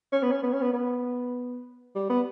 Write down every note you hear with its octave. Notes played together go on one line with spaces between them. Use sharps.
C#4
B3
C#4
B3
C#4
B3
B3
G3
B3